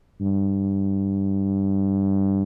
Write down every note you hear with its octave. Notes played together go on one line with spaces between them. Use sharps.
G2